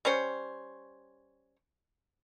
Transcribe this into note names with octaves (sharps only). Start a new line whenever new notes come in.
G3 C#4 C5 C#5